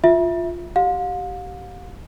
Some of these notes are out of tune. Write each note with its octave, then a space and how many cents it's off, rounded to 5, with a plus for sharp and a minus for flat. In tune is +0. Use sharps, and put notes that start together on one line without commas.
F4 +0 E5 +0
G4 -25 F5 +40